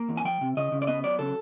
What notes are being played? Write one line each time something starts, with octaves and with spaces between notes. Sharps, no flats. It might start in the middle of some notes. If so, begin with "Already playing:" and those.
Already playing: A#3
E2
G#5
F3 G5
C3
C#3 D#5
C#3
D5
B3 D#5
F#3 D5
C#3 A4